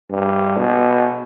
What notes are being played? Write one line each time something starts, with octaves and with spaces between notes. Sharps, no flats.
G2
B2